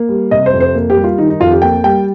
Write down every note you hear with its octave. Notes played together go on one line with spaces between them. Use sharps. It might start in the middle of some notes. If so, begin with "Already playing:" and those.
Already playing: A#3
G3
C3 D#5
C5
F2
C5
A#3
G4
G3
F4
D#3 D#4
D#4
F2 F4
G4
A#3 G5
G3 G5